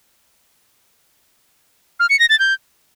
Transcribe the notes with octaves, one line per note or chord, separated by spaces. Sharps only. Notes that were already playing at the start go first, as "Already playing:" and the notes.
F6
C#7
A#6
A6
G6